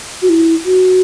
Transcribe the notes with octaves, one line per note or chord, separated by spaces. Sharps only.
F#4
E4
F#4